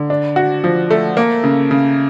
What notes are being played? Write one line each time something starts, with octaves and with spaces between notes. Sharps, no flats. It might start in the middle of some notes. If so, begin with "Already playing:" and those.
Already playing: D3
D4
F#4
F3
A3
A#3
C#3
C#3